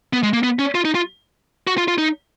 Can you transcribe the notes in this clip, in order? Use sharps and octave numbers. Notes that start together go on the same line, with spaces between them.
B3
G#3
A#3
B3
C#4
F4
D#4
F4
F#4
F4
F4
D#4